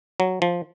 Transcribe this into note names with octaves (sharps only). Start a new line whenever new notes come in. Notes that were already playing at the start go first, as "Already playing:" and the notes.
F#3
F3